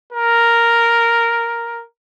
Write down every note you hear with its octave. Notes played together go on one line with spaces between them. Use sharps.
A#4